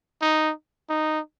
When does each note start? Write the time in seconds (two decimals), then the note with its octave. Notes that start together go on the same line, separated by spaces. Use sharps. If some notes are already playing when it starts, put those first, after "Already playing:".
0.22 D#4
0.90 D#4